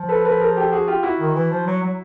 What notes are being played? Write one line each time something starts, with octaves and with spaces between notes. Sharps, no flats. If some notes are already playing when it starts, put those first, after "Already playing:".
Already playing: F3
A4 B4
A4 B4
G#4 A#4
G4 A4
F#4 G#4
F4 G4
E4 F#4
D#3
E3
F3
F#3
F#3